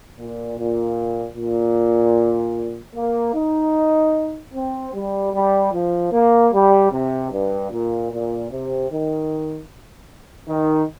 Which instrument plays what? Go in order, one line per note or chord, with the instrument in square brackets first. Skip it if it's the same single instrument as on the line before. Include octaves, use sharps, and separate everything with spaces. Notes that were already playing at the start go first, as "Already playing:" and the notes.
[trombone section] A#2
A#2
A#2
A#3
D#4
C4
G3
G3
F3
A#3
G3
C3
G2
A#2
A#2
C3
D#3
D#3